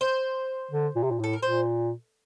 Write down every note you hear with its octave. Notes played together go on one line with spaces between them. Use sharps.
C5
D3
A#2
C3
A#2
A2 A4
A#4
A#2 C5